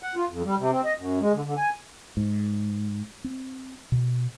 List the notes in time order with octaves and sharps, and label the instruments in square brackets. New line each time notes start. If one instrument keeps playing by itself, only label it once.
[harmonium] F#5
F4
F2
G3
C3
C4
D#5
F#2
G#3
D3
D3
G#5
[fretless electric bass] G#2
C4
B2